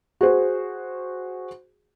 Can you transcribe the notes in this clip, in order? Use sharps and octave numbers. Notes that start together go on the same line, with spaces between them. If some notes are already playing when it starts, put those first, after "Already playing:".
F#4 G#4 C5